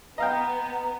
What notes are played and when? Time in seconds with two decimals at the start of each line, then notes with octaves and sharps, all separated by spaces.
0.18 B3 D#5 F5 G5 A#5